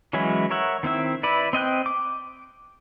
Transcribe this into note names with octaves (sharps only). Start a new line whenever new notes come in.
E3 F#3 G#3 C#4 E4
A#4 C#5 E5 F#5
D#3 C4 E4 E5
E4 B4 D5
C4 D#5 G5 F#6
D6